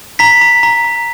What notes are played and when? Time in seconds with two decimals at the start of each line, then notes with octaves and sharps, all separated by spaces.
0.19 A#5 B6
0.41 A#5
0.63 A#5
0.84 A#5